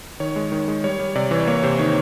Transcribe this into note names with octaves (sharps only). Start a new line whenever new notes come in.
D#3 C#5
G#3
D#3
G#3
G3 C#5
G3
C3 D5
E3 C#5
A#3 C#5
C3 C5
D#3 C#5